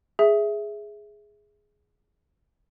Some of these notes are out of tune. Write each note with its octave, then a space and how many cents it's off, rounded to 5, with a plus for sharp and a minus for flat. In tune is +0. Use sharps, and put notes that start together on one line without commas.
G#4 +0 E5 +0